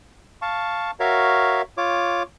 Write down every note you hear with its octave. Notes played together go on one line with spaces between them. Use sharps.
F5 A5 C#6
F#4 A#4 C#5 E5 F5
F4 C#5 D6